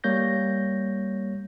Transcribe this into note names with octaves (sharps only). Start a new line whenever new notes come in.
G3 A#3 C#5 G6 A#6